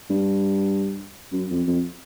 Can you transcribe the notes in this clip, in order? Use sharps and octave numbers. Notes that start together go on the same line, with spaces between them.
G2
F#2
F2
F2